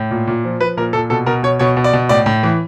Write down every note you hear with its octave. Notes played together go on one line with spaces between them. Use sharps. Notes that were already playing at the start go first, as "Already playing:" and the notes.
Already playing: A2
A#2
A#2
F3
F3 B4
A#2 A#4
A#2 A4
B2 A4
B2 A#4
B2 C#5
B2 C#5
B2
D5
B2
A2 D5
A2
E3